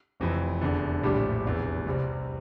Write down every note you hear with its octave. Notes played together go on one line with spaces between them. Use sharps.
F1 F2 E3
F1 E2 D3
A#1 A2 G3 D4 G4
F1 E2 E3
C2 C3 G3 C4